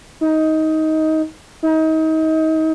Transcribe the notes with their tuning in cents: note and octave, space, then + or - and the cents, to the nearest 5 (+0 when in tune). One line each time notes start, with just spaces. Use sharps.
D#4 +15
D#4 +30